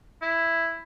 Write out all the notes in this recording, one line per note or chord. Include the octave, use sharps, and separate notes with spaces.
E4